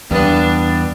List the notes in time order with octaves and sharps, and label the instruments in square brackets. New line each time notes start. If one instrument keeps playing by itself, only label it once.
[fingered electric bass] E2 [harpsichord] G2 B3 [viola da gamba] D4